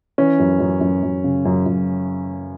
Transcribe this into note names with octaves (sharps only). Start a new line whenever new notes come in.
E3 C#4
F#2
F#2
F#2
F#2
C#3
F#2
F#2